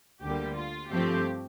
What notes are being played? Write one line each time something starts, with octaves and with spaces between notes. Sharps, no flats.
D2 D3 G3 A#3 G4
F4
G2 F3 A3 C4 G4